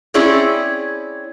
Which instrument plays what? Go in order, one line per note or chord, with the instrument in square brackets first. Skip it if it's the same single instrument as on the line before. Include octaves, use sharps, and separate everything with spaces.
[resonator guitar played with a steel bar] C4 C#4 E4 G#4 C#5 D5